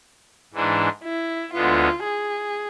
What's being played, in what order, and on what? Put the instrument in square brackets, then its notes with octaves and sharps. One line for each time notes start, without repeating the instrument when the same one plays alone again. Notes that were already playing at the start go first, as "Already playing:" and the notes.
[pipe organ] G#2 E3 G#3 D4
[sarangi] E4
[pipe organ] D2 D3 G#3 B3 [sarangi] F4
[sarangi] G#4